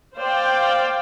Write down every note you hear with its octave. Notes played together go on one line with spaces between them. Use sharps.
C5 D5 F5 G5